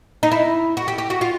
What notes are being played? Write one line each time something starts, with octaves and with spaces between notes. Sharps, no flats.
D#4
E4
F#4
G4
G4
F#4
F4